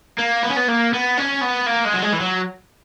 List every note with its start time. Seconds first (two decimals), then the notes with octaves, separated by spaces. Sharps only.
0.19 A#3
0.43 B3
0.50 C#4
0.57 B3
0.68 A#3
0.93 B3
1.17 C#4
1.41 B3
1.66 A#3
1.85 G#3
1.94 F#3
2.03 G#3
2.13 E3
2.21 F#3